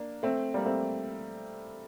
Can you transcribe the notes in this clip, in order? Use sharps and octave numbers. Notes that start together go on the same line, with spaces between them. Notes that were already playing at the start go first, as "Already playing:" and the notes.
Already playing: A#3 D4
A3 C4
G3 A#3
A3 C4